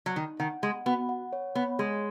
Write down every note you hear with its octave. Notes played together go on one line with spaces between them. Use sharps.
F#3
D#3 D#4
D#3 F#5
G#3 F#5
B3 F#4
F#5
C#5
B3 C#5
G#3 G#4